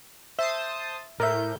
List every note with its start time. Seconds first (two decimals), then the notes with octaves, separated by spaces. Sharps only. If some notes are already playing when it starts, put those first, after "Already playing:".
0.39 C5 E5 A5 D#6
1.20 A2 A#4 E5 G6